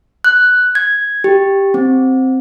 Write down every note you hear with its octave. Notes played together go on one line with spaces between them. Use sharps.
F#6
G#6
G4
C4